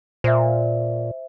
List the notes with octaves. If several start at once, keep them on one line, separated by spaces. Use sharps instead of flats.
A#2 C5 E5